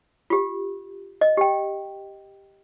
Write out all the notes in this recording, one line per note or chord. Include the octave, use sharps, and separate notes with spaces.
F4 G4
D#5
G4 G5